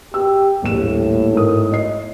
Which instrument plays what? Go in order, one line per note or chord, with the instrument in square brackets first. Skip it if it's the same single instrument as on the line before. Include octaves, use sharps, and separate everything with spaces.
[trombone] G4 [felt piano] E6
[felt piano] D#1 A#1 E7 [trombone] A2
[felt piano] G#2 A#4 D#6
D#5 C7